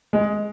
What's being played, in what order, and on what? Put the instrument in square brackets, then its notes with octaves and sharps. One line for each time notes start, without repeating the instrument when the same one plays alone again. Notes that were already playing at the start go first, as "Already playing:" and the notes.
[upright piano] G#3